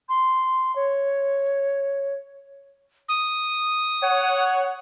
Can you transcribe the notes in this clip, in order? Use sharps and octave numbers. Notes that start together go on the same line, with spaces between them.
C6
C#5
D#6
C#5 F#5